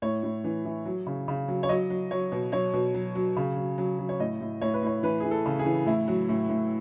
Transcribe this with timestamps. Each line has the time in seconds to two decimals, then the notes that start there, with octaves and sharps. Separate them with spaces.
0.02 A2 C#5
0.23 A2
0.44 E3
0.65 E3
0.85 F#3
1.06 C#3
1.28 C#3
1.48 F#3
1.63 C#5
1.69 F#3 D#5
1.90 F#3
2.11 F#3 C#5
2.32 B2
2.52 F#3 C#5
2.73 B2
2.94 F#3
3.15 F#3
3.36 C#3
3.57 F#3
3.78 F#3
3.99 F#3
4.09 C#5
4.19 A2 D#5
4.41 A2
4.62 A2 C#5
4.74 B4
4.83 A2 C#5
5.03 E3 B4
5.20 E3 G#4
5.31 A4
5.46 C#3
5.59 G#4
5.66 E3
5.86 A2 E4
6.08 F#3
6.29 A2
6.49 A2